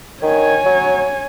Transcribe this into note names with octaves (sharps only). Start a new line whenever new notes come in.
D#3 C#5 G#5
F#3